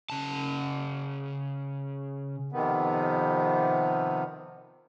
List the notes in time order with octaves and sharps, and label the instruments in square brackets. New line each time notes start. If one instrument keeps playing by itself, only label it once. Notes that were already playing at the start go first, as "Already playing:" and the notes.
[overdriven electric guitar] C#3 A5
[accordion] F2 C3 D#3 B3